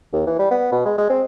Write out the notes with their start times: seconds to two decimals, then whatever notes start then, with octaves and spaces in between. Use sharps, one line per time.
0.13 D#2
0.27 E3
0.39 G3
0.51 B3
0.72 B2
0.85 G#3
0.98 G#3
1.10 C4